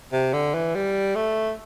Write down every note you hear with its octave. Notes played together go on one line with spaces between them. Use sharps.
C3
D3
E3
G3
A3